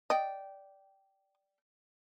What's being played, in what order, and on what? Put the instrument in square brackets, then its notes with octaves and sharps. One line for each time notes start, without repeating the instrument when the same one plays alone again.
[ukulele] D5 G5 [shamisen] D#5